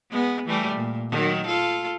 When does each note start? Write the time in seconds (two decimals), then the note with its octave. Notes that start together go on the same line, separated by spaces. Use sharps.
0.11 G#3 B3
0.46 E3 G3 A3
0.75 A#2
1.10 D#3 F#3
1.46 F4 A4